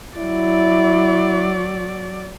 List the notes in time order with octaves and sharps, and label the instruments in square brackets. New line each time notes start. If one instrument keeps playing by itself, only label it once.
[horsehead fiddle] F#3 D5 [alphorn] E4